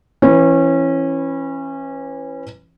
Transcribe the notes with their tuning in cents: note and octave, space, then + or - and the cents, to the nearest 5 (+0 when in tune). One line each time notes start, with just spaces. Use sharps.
E3 +15 C#4 -25 B4 +5